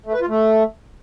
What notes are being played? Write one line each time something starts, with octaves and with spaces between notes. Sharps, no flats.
A3
B4
F4
A3